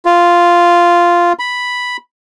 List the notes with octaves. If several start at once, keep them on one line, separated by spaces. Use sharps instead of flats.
F4
B5